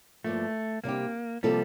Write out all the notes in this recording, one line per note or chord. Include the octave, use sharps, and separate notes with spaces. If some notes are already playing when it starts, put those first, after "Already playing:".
G2 F3 A3 A#3 F4
C3 G3 A#3 D4 G4
C3 F3 G3 A#3 F4 A4